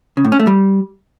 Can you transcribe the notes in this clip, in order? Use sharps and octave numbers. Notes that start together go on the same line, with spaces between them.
C#3
A2
C#4
A3
G3